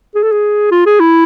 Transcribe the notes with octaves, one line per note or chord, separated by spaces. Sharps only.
G#4
A4
G#4
F4
G#4
E4